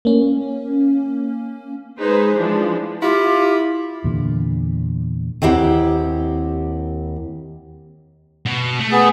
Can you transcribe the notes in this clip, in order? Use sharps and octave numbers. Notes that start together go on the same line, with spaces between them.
A#3 C#4
G#3 D#4 G#4 B4 C5
E3 F3 G#3 D4
E4 F4 G4
E2 A#2 D3
D#2 C4 E4 G4 F#5
B2
A3
B3 G#4